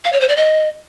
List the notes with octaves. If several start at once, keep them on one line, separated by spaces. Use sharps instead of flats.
F5
C#5
C5
D5
D#5